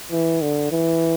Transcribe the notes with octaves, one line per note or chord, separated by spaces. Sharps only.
E3
D3
E3